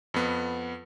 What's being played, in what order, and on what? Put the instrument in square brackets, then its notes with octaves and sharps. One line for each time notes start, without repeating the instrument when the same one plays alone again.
[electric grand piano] F2 B3